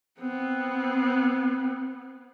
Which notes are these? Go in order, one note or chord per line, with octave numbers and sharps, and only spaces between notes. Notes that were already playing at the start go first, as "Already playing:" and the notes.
B3 C4